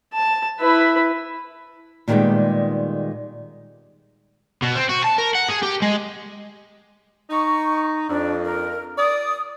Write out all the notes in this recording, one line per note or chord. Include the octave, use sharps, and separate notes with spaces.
A5
E4 B4
A#2 D#3 E3 G3 G#3 B3
B2
C4
F#4
A5
A#4
F#5
G#4
G4
G#3
D#4 C#6
F2 D4
A#4
D5 D#6